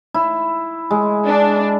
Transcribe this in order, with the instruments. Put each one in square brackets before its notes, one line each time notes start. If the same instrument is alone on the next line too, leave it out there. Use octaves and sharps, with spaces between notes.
[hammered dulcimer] E4
G#3
[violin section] D4